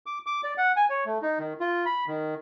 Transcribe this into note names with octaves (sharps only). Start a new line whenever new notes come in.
D6
D6
D5
F#5
G#5
C#5
A3
D#4
D#3
F4
B5
D#3